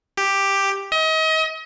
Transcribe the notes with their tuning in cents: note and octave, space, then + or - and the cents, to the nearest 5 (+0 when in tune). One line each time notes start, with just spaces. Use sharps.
G4 +5
D#5 +35